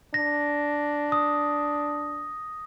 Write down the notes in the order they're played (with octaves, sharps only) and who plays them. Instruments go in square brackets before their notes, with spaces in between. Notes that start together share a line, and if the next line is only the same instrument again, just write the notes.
[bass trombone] D4 [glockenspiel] A#6
[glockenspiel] D#6